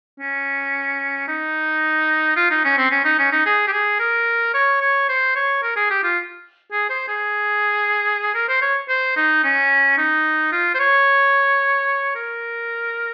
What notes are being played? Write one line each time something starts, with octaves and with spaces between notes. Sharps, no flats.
C#4
D#4
F4
D#4
C#4
C4
C#4
D#4
C#4
D#4
G#4
G4
G#4
A#4
C#5
C#5
C5
C#5
A#4
G#4
G4
F4
G#4
C5
G#4
A#4
C5
C#5
C5
D#4
C#4
D#4
F4
C5
C#5
A#4